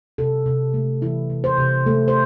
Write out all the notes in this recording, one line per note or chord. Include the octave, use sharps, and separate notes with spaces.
C3 A4
C3
A3
E3 E4
C3
C5
C3
A3 A4
C5